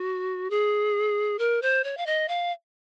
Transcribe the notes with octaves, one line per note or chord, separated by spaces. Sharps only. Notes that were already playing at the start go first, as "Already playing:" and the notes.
Already playing: F#4
G#4
A#4
C5
C#5
F5
D#5
F5